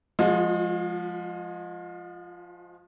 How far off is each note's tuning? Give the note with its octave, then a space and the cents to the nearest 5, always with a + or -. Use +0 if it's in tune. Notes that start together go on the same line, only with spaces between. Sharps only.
F3 +0 G#3 +0 F4 +45